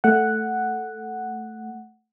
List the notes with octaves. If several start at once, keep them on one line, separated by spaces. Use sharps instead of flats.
A3 F#5